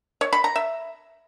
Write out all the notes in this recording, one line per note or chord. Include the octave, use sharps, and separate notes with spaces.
C#5
B5
A#5
E5